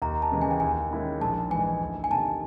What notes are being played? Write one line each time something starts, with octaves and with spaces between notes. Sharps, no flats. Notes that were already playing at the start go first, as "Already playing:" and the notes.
D#2 A#5
A5
C#3 E3 G#3
G#5
G5
D#2 G#5
D#3 G#3 C#4 E4
A#1 A5
G#2 E3 G#5
D2
G#5
C3 D#3 A5